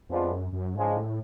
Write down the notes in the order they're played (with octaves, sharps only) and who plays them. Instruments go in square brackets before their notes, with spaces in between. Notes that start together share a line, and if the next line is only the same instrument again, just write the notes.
[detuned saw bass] F2 [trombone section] F3 G#3 B3 D4 F4
[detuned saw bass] F#2
F#2
[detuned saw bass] G#2 [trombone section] C#3 F3 G#3 D4
[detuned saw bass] A2